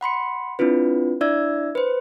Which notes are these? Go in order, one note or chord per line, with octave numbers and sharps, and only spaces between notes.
F#5 B5 C6 C#7
C4 D4 E4 F4 B4
D4 E4 D5 E5 E6 G#6
B4 C5